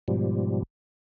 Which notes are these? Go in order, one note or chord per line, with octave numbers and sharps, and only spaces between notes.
G#2 B2 F3 G3